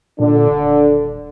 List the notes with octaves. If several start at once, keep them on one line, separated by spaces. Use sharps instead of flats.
A#2 D3 D4
D#1